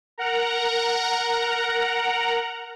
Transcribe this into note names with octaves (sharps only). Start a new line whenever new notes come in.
A#4 F#5 A#5